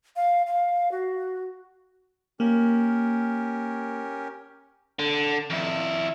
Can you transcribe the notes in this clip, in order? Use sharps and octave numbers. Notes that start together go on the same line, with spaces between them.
F5
F5
F#4
A#3 C#4 G4 A#4
D3
F2 E4